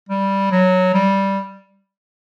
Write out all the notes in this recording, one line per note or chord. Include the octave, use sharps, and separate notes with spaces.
G3
F#3
G3